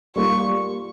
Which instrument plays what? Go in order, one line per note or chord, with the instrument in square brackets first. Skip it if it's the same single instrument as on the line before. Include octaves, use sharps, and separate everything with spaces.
[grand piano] G3 A#3 F4 [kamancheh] C#6